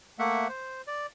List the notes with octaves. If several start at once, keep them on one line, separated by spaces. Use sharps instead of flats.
A3 A#3 E5 F#5
C5
D5